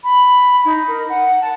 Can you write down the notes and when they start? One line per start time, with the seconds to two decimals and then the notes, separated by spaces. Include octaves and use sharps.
0.03 B5
0.65 D#4
0.87 A#4
1.09 F#5
1.41 A5